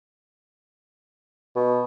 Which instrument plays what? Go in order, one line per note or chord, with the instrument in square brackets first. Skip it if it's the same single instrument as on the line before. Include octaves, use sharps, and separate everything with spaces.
[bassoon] B2